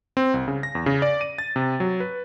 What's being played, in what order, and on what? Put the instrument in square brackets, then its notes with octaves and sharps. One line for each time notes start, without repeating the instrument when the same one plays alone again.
[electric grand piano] C4
C2
C#3
A#6
E2
C#3
D5
D#7
A6
C3
F#3
B4